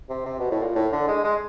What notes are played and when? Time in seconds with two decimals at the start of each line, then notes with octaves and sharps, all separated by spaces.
0.09 C3
0.26 C3
0.39 B2
0.51 A2
0.63 A#2
0.75 A2
0.92 D3
1.08 G#3
1.24 G#3